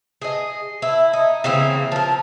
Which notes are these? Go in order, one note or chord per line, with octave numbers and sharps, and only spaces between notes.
G#4 D#5
E4
D#4
C#3 E3 A#3 C4
F3 A#4